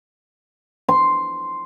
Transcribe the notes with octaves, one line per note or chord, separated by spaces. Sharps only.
C6